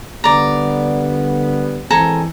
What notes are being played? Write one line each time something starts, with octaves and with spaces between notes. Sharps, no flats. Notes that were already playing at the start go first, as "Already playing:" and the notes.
D3 G3 B3 D5 A#5
E3 G#3 C4 A4 G#5 A#5